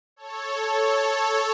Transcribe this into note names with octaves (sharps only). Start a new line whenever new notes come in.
A4 C#5
A4 C#5